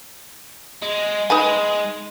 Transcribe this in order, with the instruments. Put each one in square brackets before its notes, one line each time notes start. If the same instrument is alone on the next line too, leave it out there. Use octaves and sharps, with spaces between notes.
[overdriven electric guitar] G#3
[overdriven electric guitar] G#3 [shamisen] D#4 B4 G#5